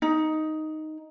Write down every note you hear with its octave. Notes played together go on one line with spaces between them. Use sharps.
D#4